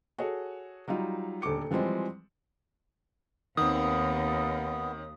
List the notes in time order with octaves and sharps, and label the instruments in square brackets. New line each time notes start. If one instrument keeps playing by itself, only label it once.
[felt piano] F#4 G#4 A4 C#5
F#3 G3 D#4 F4
D#1 D2 A4 D6 C#7
E3 F3 G3 G#3 C4
[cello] D#2 [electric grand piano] D#3 C4 [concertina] B3 [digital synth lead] D#6